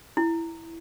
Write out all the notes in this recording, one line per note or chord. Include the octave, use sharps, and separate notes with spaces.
E4